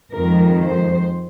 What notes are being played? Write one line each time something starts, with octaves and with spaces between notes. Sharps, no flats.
F2 D#3 G#3 A#4
C5